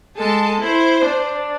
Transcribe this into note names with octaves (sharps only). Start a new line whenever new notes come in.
G#3 A4 A5
E4 C5
D4